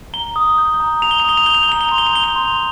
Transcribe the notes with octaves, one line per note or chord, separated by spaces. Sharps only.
A#5 G7
D#6
G6
A#5
A#5 F7
G7
F7
D#6 G7
F7
G6 G7
F7
G7
A#5 F7
G7
C6 F7
G7
F7
G6 G7
F7
C6